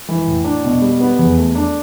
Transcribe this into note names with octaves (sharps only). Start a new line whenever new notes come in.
E3
A2
D4
B2
G3
B3
E2
A3
D4